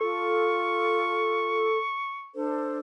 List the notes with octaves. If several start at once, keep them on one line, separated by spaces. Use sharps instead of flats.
F4 A4 C#6
D4 A4 C5